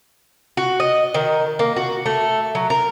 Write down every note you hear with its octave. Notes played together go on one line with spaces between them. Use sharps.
F#4
D#5
D#3
A#3
F#4
A3
F#3
A#4